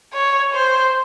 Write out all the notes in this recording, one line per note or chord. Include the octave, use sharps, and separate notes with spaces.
C#5
C5